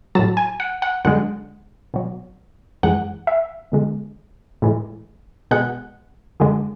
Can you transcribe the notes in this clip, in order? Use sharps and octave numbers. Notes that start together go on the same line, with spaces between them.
A2 F#3 A5
G#5
F#5
F#5
F#2 D3 G#3 F#5
B2 F#3
F#2 E3 G#3 F#5
E5
E2 D3 G#3
A2 E3 G#3
B2 G#3 F#5
F#2 D3 G#3